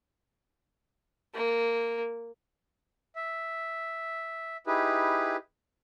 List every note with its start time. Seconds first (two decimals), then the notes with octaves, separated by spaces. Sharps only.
1.35 A#3
3.16 E5
4.67 D#4 E4 G4 G#4 B4